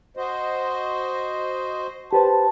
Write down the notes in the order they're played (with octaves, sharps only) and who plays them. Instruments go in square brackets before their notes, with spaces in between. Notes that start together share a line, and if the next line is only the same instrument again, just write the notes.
[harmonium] F#4 C5 D#5
[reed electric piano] G4 B4 C5 [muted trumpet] A5